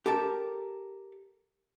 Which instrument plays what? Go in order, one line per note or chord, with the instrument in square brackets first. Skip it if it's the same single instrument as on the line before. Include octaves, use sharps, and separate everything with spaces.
[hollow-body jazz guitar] G4 A4 A#4 A5